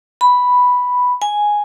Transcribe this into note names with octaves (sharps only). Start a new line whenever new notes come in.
B5
G#5